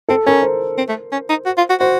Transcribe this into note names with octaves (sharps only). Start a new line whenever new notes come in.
C4 A4
C#4 A#4
C5
C4
A3
C#4
D#4
F#4
F4
F#4
F#4 C5